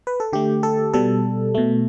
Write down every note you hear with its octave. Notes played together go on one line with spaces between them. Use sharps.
B4
A4
D3 A3 G4
A4
B2 G3 A4
B2 A3